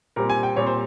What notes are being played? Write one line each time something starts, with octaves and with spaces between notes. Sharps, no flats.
A#2 G3 C4 A#4
G#5
G5
A#2 G3 C4 C#5
C5